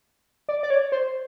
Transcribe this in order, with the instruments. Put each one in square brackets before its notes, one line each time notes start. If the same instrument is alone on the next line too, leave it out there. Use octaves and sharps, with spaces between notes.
[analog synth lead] D5
D5
C#5
C5